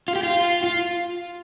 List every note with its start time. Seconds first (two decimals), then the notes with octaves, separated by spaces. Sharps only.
0.08 F4
0.16 G4
0.23 F4
0.64 F4